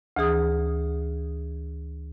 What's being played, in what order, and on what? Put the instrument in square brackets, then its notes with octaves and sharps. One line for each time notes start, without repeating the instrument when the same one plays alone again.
[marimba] D2 E3 G#4 D#6